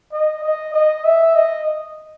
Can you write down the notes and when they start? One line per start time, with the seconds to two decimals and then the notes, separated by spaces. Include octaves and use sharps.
0.12 D#5
0.44 D#5
0.74 D#5
1.04 E5
1.35 D#5